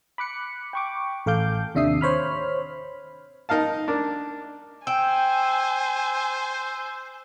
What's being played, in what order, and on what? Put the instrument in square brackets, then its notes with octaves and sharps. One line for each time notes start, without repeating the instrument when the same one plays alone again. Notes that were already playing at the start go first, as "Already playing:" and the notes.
[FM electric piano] B5 D6 F#6 C#7
G5 C#6 D6
A1 A4 F5 D6 G6
D#2 C3 D4 E5 D#6 C7
C5 C#5 B5 F6
[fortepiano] D#4 A#4 F5 A5
D4 A#4
[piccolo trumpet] C5 [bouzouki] G5 [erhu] G#5 [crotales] E6 E7